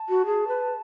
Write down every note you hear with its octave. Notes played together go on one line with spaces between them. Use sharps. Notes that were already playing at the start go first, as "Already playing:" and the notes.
Already playing: A5
F#4
G#4
B4